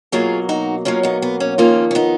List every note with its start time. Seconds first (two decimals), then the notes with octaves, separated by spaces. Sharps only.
0.12 B2 F#3 A#3 F4 G#4
0.49 D#4 F#4
0.85 B2 F#3 A#3 C#4 F4
1.03 B3 D#4
1.22 B3
1.40 C#4
1.58 F2 D#3 A#3 C#4 F4
1.91 C#4
1.95 B3 D#4